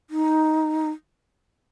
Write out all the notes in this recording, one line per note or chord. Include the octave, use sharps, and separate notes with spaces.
D#4